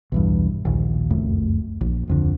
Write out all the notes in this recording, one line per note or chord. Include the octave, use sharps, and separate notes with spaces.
B1 E2 G2
A#1 D#2
F1 C#2 F#2 A3
A#1
D1 F2 D3